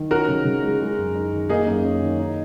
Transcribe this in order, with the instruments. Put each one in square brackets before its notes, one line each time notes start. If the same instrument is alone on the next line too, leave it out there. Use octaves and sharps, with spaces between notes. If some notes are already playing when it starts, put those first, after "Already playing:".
Already playing: [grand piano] D#3
[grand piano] C#4 [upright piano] F#4 A#4
[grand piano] C#3
C#3
G#3
G#3
F#2
D#4
D#3
[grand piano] A#3 [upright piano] D#4 G#4
[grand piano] F#2
C#4
D#3
D#4